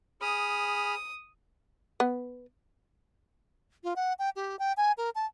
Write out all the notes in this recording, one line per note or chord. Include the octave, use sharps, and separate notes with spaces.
G#4 B5 D#6 F6
B3
F4
F#5
G5
G4
G5
G#5
A#4
A5